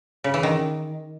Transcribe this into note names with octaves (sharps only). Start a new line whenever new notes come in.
C#3
E3
D#3